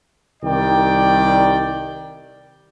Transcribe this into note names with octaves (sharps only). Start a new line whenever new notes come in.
C2 D#3 G3 D5 G5